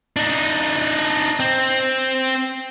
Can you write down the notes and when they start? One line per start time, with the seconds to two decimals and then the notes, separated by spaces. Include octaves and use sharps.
0.17 D4 D#4
1.40 C4